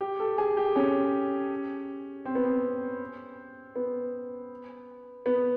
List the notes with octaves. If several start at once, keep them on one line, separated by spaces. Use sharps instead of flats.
G4
A4
G#4
G4
C#4
C4
B3
C4
B3
B3